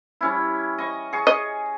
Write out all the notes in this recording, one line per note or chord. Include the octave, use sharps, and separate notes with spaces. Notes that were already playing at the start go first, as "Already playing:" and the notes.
G3 C#4 E4
D#5 C#6
G#4 C#6
D#5